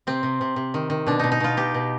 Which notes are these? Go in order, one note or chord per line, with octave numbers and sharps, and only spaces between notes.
C3 C4
C3
C3
C3
D#3
D#3
B2 D4
B2 D#4
D#4
B2 F4
B2 G4
B2